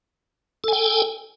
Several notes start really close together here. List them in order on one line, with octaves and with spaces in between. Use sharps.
A4 G#5 G5